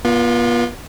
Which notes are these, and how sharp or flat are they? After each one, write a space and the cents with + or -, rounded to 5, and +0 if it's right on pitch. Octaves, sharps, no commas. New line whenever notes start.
B3 -40 F4 +0